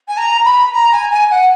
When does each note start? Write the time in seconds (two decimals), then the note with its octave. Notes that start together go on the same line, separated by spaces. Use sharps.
0.08 G#5
0.17 A#5
0.45 B5
0.73 A#5
0.92 G#5
1.11 G#5
1.31 F#5